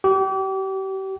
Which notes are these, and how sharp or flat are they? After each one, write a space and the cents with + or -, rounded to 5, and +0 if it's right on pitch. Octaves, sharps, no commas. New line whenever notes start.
G4 -35